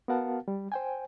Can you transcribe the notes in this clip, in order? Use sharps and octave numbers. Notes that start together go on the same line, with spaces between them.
B3 F#4 A#4 F5 F#5 A5
G3
C5 G5 G#5